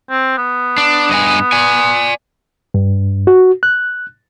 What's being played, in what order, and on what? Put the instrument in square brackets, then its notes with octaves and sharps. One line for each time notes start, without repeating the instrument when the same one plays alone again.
[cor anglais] C4
B3
[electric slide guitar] D4
G2 D#5 G#5
D5 G#5
[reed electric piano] G2
F#4
F#6